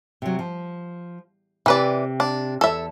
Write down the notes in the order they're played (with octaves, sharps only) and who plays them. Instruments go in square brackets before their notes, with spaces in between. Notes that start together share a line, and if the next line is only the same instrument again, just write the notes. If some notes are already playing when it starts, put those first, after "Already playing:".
[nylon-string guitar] C3 F#3
F3
[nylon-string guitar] C3 G4 [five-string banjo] E3 B4 D5
[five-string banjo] D4
[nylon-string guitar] E2 A5 [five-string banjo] A4 E5